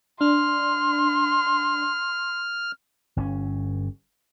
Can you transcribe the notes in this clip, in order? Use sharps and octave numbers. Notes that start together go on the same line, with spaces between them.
D4 C6 F6
G1 C4 C#4